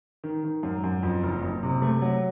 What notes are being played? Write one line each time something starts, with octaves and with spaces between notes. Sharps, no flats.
D#3
D#3
F#2
F#2
F2
F#1
F#1
C3
A3
F#3